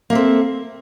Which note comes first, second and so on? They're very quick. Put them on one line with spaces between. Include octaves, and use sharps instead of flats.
A#3 E5 C4 A4